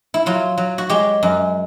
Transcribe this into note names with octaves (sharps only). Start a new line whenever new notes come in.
E4
F#3 F4
F#3
F#4
G#3 G4
F#2